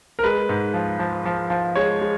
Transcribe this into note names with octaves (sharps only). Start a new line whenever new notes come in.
A#4
G#3 B4
G#2
F3
F3
F3
F3
G#3 C#5
G#3